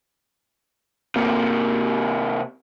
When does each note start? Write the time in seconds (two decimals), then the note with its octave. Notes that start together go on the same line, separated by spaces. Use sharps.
1.16 C3 A#3